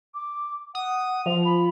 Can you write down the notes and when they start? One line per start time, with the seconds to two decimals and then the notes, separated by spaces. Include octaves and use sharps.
0.14 D6
0.75 F#5 D#6
1.26 F3 F7
1.45 B5